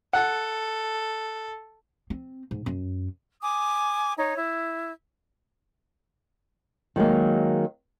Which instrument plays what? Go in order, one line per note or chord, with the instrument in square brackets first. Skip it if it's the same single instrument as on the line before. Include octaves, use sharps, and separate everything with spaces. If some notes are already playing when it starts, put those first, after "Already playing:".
[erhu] A4 [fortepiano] F#5
[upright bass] C4
G#2
F#2
[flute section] G#5 D6 D#6
D#4 C#5
E4
[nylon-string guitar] D#3 F#3 G#3 A#3